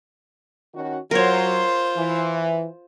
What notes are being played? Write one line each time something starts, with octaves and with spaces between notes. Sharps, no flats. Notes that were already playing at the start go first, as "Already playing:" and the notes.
D#3 C#4 F#4
F#3 F4 A#4 C5 C#5
E3